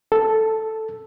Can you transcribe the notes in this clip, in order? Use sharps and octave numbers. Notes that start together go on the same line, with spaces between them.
A4